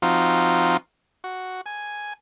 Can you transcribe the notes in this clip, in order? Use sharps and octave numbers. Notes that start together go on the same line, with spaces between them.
F3 C4 D#4 F4 F#4
F#4
G#5